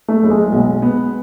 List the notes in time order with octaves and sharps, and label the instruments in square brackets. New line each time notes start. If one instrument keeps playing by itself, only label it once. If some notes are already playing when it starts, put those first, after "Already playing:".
[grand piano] A3
[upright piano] F#1
[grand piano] G#3
[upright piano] B1
B3